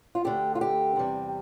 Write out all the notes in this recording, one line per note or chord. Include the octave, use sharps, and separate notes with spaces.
F4
D2 D3 A3 G4
F4
G4
E2 C3 G3